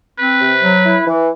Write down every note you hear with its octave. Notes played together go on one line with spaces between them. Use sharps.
C4 B4
C3
F#3
E4
E3